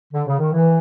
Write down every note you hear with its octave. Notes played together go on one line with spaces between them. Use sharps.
D3
C#3
D#3
E3